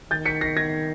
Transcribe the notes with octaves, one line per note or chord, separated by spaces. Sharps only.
D#3 G6 A6
B6 C#7
A#6 C7
G#6 A#6